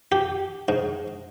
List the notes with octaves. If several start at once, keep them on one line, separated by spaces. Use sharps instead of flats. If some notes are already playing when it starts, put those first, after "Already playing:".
G4
G#2